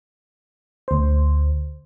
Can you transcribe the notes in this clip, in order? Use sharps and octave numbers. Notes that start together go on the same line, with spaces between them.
D2 C5